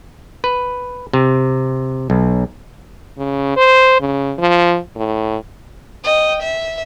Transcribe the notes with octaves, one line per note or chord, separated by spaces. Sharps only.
B4
C3
B1
C#3
C5
C#3
F3
A2
D#5 G5
E5